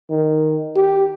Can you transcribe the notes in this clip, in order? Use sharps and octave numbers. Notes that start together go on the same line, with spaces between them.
D#3
G4